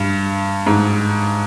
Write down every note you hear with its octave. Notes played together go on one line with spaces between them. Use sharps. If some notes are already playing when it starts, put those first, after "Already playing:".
Already playing: G2
G#2